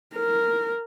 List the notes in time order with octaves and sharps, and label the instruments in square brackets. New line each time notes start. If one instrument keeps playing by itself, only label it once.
[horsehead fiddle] A#4